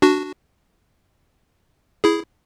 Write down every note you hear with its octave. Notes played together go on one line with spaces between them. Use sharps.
D4 F#4
E4 G#4